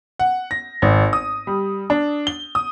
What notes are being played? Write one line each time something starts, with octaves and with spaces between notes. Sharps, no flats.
F#5
A#6
G#1
D#6
G3
D4
G7
D#6